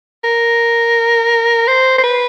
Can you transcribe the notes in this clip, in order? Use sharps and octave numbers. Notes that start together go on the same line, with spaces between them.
A#4
C5
C5
B4